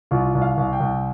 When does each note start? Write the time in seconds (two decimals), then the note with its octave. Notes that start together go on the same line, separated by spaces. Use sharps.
0.11 C2 F4
0.35 C2
0.42 F5
0.57 C2
0.73 G5
0.80 C2